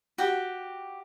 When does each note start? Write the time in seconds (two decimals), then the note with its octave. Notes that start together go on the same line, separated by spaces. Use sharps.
0.18 F#4 G4 G5